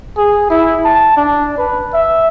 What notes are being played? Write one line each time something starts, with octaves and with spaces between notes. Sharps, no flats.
G#4
E4
A5
D4
B4
E5